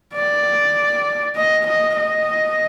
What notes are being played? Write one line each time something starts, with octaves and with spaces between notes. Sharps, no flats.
D5
D#5
D#5
D#5